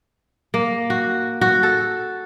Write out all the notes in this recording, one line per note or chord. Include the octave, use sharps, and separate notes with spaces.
A#3
F#4
F#4
A4